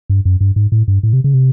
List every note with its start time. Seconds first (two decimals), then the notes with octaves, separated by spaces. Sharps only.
0.10 G2
0.25 F#2
0.41 G2
0.56 G#2
0.72 A2
0.88 G2
1.03 A2
1.13 C3
1.24 C#3
1.34 C3